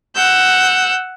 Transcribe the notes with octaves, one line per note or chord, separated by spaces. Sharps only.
F#5 E6 G6